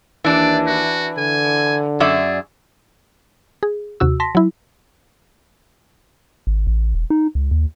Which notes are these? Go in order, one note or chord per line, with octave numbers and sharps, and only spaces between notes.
D#2 E3 D4 D5
F#4
D3 G#5
F#2 G#4 D5 E5
G#4
D#2 C3 F#4 E6
A5 C6 A#6 B6
F#3 E4
G#1
A1
E1
D#4
C#2
D#2